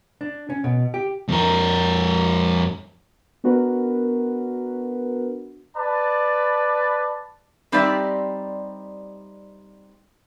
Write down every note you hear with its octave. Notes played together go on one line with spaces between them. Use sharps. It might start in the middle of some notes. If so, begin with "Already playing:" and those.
D4
C#4
B2
G4
F2 A#4
B3 D4 F#4 A#4 B4
B4 D5 A5
G3 C4 D#4 G4 D5 E5